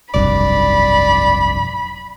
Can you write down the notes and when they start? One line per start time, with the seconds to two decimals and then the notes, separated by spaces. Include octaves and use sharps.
0.14 F1 B1 G2 D5 B5